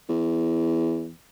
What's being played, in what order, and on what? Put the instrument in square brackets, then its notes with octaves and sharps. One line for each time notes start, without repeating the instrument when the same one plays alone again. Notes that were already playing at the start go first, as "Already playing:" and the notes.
[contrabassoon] E2